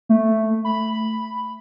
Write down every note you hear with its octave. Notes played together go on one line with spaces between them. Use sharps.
A3
B5